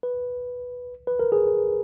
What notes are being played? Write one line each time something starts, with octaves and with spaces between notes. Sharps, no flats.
B4
B4
A#4
G#4